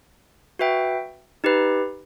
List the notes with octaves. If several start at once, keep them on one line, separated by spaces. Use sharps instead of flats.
F#4 B4 E5 G5
D#4 G4 B4